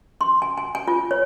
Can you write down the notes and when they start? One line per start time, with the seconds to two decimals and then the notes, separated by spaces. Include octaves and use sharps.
0.21 C6
0.42 G#5
0.58 G#5
0.75 G#5
0.88 F4
1.11 C#5